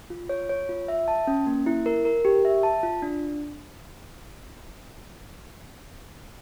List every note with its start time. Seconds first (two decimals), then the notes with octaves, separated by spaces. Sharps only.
0.10 F4
0.29 C#5
0.49 C#5
0.69 F4
0.88 E5
1.08 A5
1.27 C#4
1.47 A#3
1.66 E4
1.86 A#4
2.05 A#4
2.25 G4
2.45 E5
2.63 A5
2.83 F4
3.02 D4